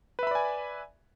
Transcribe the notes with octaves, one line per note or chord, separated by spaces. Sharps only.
B4 D5 E5 G#5 B5